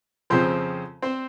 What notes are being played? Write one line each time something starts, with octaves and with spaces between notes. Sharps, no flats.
F2 C#3 F3 C4 C5
C4 C5